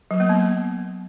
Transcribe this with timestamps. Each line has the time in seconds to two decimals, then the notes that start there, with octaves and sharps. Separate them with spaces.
0.11 F#3
0.20 A#3
0.29 B3